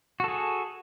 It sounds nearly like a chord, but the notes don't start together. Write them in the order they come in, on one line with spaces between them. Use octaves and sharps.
F#4 A4 G#4